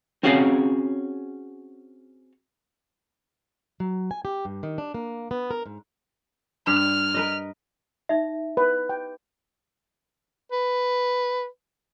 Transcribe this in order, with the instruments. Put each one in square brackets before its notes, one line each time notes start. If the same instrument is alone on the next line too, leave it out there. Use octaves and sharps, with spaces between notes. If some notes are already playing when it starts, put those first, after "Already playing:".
[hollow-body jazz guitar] C4 C#4 F#4 G#4 C#5 F5
[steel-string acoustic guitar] F#3
G#5
G4
G2
D#3
D4
A#3
B3
A#4
G#2
[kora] G2 [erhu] F6
[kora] A#4 B4 D#5
[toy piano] D#4 E5
[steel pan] B4
G5
[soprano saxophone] B4